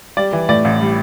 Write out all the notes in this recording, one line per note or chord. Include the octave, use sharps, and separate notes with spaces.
G3 D5
E3
A2 D5
A1
G3